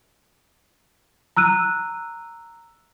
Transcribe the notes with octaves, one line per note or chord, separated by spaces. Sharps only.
A#5 E6 F#6 D#7